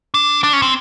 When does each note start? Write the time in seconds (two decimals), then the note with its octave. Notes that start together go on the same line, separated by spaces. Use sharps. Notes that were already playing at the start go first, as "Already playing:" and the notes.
0.14 D4
0.43 D4
0.53 C#4
0.62 C4